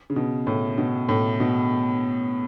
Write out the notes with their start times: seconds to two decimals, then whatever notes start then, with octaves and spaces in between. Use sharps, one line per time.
0.10 C#3
0.16 B2
0.47 A2
0.78 B2
1.09 A2
1.40 B2